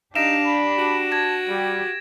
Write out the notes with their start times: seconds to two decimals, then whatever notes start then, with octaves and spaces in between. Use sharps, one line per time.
0.15 D4 D#4 G4 F5 A#6 D7 E7
0.46 B5
0.78 F#4
1.12 A5 G#6 A#6
1.49 G3 G4